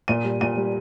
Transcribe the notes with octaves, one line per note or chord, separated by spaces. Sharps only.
A#2 D#7
G3
A#2 D#7
G3